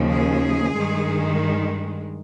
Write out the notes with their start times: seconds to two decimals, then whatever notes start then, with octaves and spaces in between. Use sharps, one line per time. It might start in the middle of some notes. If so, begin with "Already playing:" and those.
Already playing: D#2 C#3 F3
0.11 G#4
0.74 G2 D#3 G#3